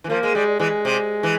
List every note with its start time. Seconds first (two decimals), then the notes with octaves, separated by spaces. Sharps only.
0.04 E3
0.09 F3 A#3
0.23 G#3
0.35 G3 G#3
0.59 E3 G#3
0.85 C3
1.23 E3